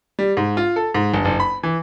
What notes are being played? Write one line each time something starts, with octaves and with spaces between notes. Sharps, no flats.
G3
G#2
F4
A4
G#2
G1
F#1
B5
E3